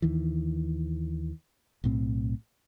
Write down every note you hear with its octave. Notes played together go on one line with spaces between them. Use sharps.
D#2 D#3 E3
B1 A2 C4